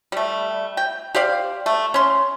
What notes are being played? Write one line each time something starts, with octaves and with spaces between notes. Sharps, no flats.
G3 A3
G5
G4 C5 D5 F5
A3
C#4 C6